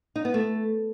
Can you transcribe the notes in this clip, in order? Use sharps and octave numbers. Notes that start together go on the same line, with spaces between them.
D#4
B3
A3